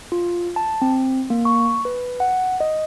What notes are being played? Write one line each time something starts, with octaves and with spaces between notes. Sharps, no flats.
F4
A5
C4
A#3
C#6
B4
F#5
D#5